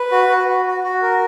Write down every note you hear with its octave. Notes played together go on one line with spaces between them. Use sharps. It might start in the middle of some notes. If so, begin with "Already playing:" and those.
Already playing: B4
F#4
F#4
F#4
F#4
F#4
A#4